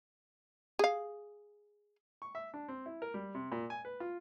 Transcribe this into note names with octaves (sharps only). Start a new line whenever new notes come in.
G#4 F5
C#6
E5
D4
C4
E4
A#4
G3
C3
A#2
G#5
B4
F4